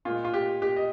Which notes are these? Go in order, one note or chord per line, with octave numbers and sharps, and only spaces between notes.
A#2 G#3 F4
F4
G4
G4
D#5